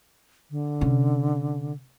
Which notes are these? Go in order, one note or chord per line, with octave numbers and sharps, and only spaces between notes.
D3
C3 C#4